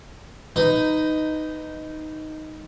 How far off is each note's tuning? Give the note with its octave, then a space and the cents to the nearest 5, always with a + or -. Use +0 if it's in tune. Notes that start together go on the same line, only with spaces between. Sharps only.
D#4 +0 B4 +15